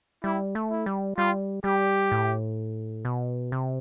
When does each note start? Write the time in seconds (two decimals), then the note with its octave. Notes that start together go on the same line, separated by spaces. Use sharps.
0.24 G3 E4
0.55 A3
0.70 E4
0.86 G3
1.17 G3 F4
1.64 G3 G4
2.12 A2
3.05 B2
3.52 C3